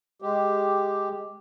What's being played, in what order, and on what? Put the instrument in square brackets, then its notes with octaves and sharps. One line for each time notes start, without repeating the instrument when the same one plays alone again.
[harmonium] G#3 G4